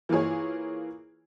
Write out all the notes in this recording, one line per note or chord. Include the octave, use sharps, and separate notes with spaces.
E3 A#3 F4 G#4 C#5